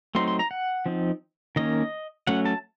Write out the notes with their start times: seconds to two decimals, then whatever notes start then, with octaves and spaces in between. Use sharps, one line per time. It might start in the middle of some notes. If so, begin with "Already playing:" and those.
0.15 F#3 A3 C4 D#4 C6
0.28 C6
0.39 A#5
0.51 F#5
0.86 F3 C4 D#4
1.56 D#3 A#3 C#4 D#5
2.27 F#3 A3 C#4 F#5
2.45 A5